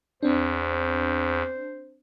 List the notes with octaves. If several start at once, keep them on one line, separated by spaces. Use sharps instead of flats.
E2 C4 D4 C5